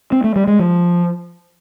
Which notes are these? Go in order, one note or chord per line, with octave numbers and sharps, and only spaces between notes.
C4
A3
G3
G#3
F3